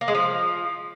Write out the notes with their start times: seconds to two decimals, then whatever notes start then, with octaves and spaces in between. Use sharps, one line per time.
0.01 A#3
0.08 G#3
0.15 F3